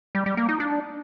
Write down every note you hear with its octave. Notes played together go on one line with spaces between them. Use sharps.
G3
G3
A#3
D#4
D4